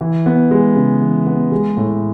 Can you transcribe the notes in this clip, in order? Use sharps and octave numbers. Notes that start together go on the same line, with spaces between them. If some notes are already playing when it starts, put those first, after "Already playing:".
E3
B3
G#3
C#3
E3
B3
G#3
A2